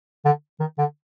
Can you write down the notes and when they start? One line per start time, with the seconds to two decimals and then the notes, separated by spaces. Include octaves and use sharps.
0.25 D3
0.60 D#3
0.78 D3